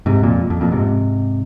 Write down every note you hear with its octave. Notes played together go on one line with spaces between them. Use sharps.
G#2 C3
F2 A#2
F2
F2 A#2
G#2 C3